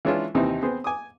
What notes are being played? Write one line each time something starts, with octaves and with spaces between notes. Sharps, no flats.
E3 G#3 C#4 D4 E4 F4
D#2 C3 E3 C4 D#4
B3 C4 G#4 C5
G#5 D6 D#6